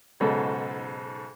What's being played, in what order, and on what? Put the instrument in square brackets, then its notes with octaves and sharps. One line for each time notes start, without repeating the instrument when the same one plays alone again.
[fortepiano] B1 G#2 C#3 A4 F#5